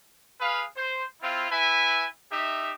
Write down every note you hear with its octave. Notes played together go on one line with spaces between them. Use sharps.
G#4 B4 F5
C5
C4 E4 F4
E4 B4 E5 G#5
D#4 G4 E5